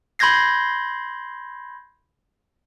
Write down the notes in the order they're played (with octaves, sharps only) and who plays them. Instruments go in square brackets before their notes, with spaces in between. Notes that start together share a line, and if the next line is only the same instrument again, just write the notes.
[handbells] B5 C6 G6 G#6 A#6 C7